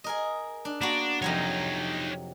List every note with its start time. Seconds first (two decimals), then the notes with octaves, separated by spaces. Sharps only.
0.04 G#4 A#4 D#5
0.65 D4
0.81 A#3 B3 D4 F#4
1.22 F2 C3 F#3 D#4 C#5